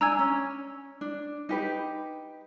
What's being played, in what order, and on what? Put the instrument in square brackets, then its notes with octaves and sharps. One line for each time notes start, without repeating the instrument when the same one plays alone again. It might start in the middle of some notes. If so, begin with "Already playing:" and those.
[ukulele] D4 G#5 [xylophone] A#5 E6 G#6
[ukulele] C#4
D4
D#4 G4 B4